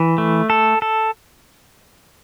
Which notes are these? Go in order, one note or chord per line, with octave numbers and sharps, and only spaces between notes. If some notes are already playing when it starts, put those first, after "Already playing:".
Already playing: E3
A3
A4
A4